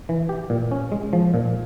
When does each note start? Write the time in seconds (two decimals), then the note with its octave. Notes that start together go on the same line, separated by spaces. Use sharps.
0.09 E3
0.29 G4
0.50 A#2
0.71 C#4
0.92 G#3
1.13 F3
1.34 A#2